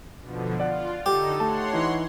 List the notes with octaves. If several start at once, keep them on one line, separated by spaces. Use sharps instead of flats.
B2 D3 F3
F4 D5 F#5
D3 D#4 G4 A4
A3 C#5 F#5 A5 C6
E3 D#4